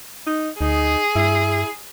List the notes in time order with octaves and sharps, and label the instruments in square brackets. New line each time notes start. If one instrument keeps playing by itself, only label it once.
[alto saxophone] D#4
[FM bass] D2 [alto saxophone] D#4 [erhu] G#4
[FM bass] G2 [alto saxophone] E4